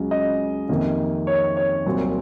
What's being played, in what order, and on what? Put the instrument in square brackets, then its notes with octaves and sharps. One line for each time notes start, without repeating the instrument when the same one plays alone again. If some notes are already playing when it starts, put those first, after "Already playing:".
Already playing: [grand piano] C#2 C#3 F#3
D#5
F2 C3 D#3 A#3
C#5
C#5
C2 A#2 F#3 C4